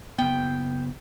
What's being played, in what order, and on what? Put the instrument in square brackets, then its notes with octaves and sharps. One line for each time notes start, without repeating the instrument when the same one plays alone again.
[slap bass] F#1 B3 [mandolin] G5